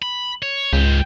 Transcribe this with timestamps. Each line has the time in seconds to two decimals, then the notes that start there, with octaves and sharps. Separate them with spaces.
0.02 B5
0.42 C#5
0.73 C#2 G#2 G4